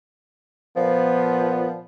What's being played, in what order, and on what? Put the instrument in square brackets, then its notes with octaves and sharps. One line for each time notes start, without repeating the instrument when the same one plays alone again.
[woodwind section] A#2 F3 [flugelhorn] B3